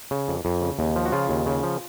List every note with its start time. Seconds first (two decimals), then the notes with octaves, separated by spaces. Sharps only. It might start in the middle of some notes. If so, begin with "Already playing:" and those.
0.11 C#3
0.28 F2
0.45 F2
0.62 C#3
0.79 D#2
0.96 F3
1.06 F#4
1.12 C#3 F4
1.29 D#2
1.46 C#3
1.63 F3